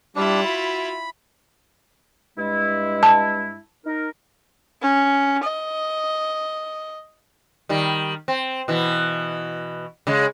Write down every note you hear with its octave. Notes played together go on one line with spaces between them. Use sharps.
G3 D4 E4 F4
F#4 B5
G2 G#3 E4
A5
D#4 A#4
C#4
D#5
D#3 G3
C4
B2 E3
C#3 G#3